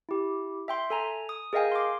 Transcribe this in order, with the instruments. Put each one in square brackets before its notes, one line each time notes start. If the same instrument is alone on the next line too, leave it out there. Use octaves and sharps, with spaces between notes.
[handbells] E4 G4
E5 G5 C6
A4 G#5 A#5
D#6
G#4 A#4 D#5 F5 G5 G#5
C6 D6